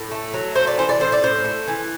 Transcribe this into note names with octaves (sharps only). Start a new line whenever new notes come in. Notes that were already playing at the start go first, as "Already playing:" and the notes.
Already playing: A2
A3
F#3
A3 C5
D5
E3 C5
D5
A2 C5
D5
A2 C5
A3
E3